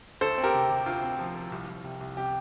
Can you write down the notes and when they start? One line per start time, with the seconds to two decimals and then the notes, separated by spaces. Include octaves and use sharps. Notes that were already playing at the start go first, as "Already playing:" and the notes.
0.21 D2 A4 C5
0.38 C4
0.43 G4 A#4
0.54 C3
0.70 C3
0.86 D2 F4
1.03 C4
1.19 F3
1.36 F3
1.52 C2
1.68 C2
1.84 C3
2.00 C2
2.17 C3 G4